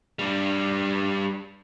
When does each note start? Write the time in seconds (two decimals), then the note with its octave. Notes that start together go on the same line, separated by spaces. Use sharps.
0.19 G3 D4